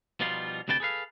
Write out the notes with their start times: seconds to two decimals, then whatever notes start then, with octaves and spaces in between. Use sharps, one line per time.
0.20 B2 F3 G3 D#4 F4
0.68 D2 C3 D4 B4 G5 A5
0.80 G#4 A4 B4 F5